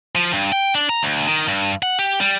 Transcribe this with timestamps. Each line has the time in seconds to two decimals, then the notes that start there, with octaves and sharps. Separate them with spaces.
0.15 F3
0.33 G2
0.52 G5
0.75 D4
0.89 A#5
1.03 D2
1.27 D#3
1.48 G2
1.83 F#5
1.99 G4
2.21 G3